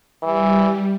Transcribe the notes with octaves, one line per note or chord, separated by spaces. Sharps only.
E3 G3